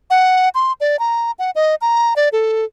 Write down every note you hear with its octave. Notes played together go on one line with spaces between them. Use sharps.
F#5
C6
D5
A#5
F#5
D#5
A#5
D5
A4